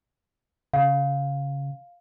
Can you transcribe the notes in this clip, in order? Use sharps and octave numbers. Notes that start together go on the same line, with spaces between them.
C#3 F5